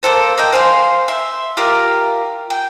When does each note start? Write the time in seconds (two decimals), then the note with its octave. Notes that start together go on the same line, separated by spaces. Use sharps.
0.03 A#3 D4 A4 C5
0.38 A#3 D#5 G5
0.53 C5 F5 G#5 C6
1.08 E5 C6
1.57 F4 G4 A#4 D5
2.50 G5